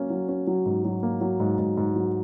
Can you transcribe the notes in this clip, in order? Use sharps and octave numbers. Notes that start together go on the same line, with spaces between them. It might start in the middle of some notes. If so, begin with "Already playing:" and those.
Already playing: F#3 A#3 C#4
F#3
C#4
F#3
G#2
F#3
A#3
F#3
G#2
G#2
G#2
F#3